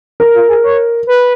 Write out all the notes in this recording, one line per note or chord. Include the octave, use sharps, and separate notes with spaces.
A#4
F4
G#4
C#5
B4